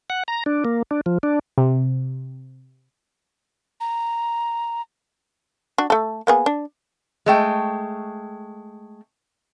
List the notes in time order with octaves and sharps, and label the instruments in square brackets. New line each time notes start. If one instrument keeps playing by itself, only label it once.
[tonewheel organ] F#5
A#5
D4
A#3
D4
F3
D4
[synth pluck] C3
[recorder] A#5
[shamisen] D4 F#4
A3 A4
A#3 B3 G#4
D4
[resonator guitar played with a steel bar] G#3 A3 G5